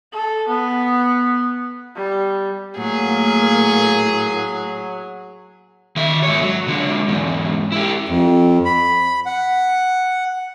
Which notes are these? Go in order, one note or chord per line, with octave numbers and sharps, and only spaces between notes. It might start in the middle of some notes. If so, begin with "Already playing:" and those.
A4
B3
G3
A2 F#3 A#3 G#4
D#3 E5
G#2 C#5
F#3
D3 G#3
E2 G#2
E4 G4
F2
B5
F#5